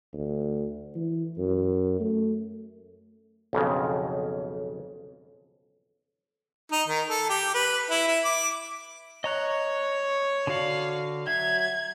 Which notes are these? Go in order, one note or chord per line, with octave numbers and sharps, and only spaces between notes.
D2
E3
F#2
A3
B1 F2 C#3
D#4
D#3
A4
G4
B4
E4
E4
D6
C#5 D#5 A#5 F#6
D3 F#4 D5 F5
F#3 E5 G#6